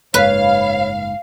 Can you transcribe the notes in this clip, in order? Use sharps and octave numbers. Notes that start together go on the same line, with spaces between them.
F#1 G#2 B4 C#5 F5